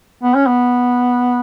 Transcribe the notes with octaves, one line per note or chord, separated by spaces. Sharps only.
B3
C#4
B3